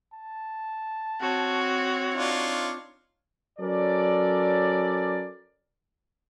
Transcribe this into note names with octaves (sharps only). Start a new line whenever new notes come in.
A5
C4 F#4 C#5
D4 D#4 F4
F#3 C#4 A4 A#4 D5